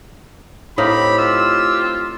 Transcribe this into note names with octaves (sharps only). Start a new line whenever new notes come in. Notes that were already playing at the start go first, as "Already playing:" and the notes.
A2 C4 D#4 G4 F5 B5
F4 E6